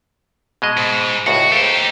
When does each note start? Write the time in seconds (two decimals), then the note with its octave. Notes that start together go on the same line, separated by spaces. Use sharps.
0.62 B2 G#3 D#5
0.77 G#2
1.27 C#2 A2 F#4
1.52 D#4 G4 A4 C5